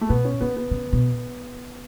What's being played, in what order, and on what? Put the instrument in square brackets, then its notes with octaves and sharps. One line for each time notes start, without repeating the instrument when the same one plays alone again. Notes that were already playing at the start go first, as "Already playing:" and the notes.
[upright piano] A3
[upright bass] B2 [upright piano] B3
[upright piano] C#4
[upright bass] C#3 [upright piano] B3
[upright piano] B3
[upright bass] C#3
B2